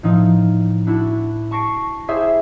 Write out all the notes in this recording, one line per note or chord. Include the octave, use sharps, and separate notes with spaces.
A2 F3 D#4
D4 E4 F#4
A5 C#6 A#6 C7 D7
E4 G4 G#4 C5 E5 C6